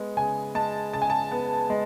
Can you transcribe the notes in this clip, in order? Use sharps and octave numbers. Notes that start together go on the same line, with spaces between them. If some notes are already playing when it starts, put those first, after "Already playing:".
Already playing: G#3 B3
C#3 G#5
G#3 A5
C#3 A5
G#5
A5
B3
G#3